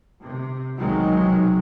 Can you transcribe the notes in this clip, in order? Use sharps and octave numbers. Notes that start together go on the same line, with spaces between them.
C3
F1 B1 C3 D#3 F#3 G#3